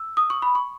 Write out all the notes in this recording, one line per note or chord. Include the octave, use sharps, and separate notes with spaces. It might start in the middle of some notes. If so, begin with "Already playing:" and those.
Already playing: E6
D#6
C#6
B5
C#6